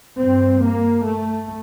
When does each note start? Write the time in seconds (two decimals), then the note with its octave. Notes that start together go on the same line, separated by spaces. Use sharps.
0.19 G2 C4
0.63 A#3
1.06 A3